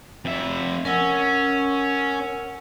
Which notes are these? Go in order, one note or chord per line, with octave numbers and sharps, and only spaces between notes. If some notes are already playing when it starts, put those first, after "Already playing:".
F2 E5
C#4 A#4 F#5 E6